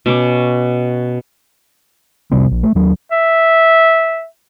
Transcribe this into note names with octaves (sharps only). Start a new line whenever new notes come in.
B2 C#4 D6
F1 C3 G3 C4
A#1
A3
D#2 F#3
E5